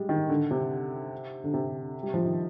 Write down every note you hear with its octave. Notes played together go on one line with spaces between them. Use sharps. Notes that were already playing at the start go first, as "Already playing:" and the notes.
Already playing: G3 G#3
D#3
D3
C3
D3
C3
G3
F3
D#3